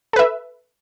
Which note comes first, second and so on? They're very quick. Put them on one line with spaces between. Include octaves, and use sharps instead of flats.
A4 B4 E5